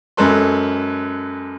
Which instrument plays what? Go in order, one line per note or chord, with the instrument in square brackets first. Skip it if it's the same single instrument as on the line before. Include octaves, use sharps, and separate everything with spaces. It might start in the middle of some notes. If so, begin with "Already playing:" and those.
[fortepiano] F#2 G#3 A4 B4 C6